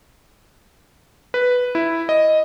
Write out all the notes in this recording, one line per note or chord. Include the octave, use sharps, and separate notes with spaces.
B4
E4
D#5